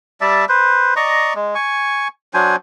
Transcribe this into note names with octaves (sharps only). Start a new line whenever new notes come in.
G3 D5 E5 A5
B4 C5
D5 D#5 A#5 C#6
G#3
G#5 C#6
F#3 D4 C5 G#5